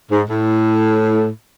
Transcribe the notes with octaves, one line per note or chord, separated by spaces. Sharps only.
G#2
A2